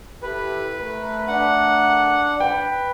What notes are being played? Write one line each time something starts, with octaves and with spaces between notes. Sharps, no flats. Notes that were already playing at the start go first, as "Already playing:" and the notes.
E4 G4 A4 B4
A3 A#4
D4 F#5
B4 G5